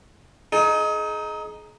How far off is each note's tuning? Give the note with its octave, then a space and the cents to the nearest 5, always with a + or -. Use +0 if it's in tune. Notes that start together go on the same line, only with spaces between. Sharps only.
D#4 +0 G#4 +35